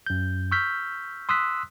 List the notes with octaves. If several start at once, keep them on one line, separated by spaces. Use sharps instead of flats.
F#2 G6
C#6 E6 F6 G6 B6
C6 D#6 E6 F#6 B6